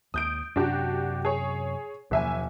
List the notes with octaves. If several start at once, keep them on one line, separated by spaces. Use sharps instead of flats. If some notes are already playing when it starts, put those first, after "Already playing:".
D#2 D#6 G6 D7
F#2 C3 D4 F#4 G4
G#4 C#5
F#1 D#2 B2 F3 E5 G#5